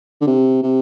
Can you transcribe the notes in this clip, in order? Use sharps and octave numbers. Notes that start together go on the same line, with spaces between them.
D3
C3
C3